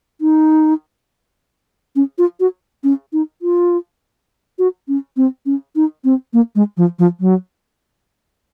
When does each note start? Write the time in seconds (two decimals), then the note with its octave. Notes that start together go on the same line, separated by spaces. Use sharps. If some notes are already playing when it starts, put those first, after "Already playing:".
0.21 D#4
1.96 C#4
2.18 F4
2.40 F#4
2.84 C#4
3.13 D#4
3.42 F4
4.59 F#4
4.88 C#4
5.17 C4
5.46 C#4
5.76 D#4
6.04 C4
6.33 A#3
6.55 G#3
6.77 F3
6.99 F3
7.20 F#3